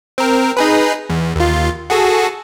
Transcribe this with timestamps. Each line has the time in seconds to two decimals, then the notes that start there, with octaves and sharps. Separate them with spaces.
0.18 C4 A#4
0.57 D#4 G#4 B4
1.10 E2
1.36 D#2 F4
1.90 F#4 G#4 A4